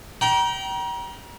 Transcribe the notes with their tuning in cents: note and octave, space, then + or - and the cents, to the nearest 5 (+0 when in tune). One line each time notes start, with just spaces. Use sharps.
G5 -25 A#5 +35